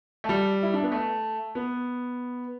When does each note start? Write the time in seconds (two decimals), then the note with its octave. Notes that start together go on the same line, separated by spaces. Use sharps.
0.24 A3
0.29 G3
0.63 E4
0.74 D4
0.83 B3
0.92 A3
1.55 B3